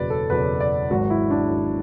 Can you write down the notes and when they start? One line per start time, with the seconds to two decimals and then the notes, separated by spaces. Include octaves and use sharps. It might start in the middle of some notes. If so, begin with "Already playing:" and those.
Already playing: F#1 E2 B2 F#3 B4 D5
0.10 A4
0.30 F#1 E2 B2 F#3 B4
0.60 D5
0.90 G#1 G#2 F#3 F#4
1.10 E4
1.30 D4
1.50 G#1 G#2 F#3